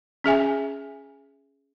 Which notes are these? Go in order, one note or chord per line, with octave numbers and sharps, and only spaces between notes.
C#4 G#4 E5 G#5